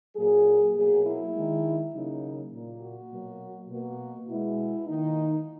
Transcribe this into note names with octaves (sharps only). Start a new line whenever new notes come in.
A#2 F#3 A#3 G#4
B2 F#3 A#3 G#4
E4
D#3 G#3
C#3 F#3 A#3 D#4
A#2 A#3
F#4
B2 F#3 A#3
B2 A#3 F#4
B2 G#3 E4
D#3 A#3 D#4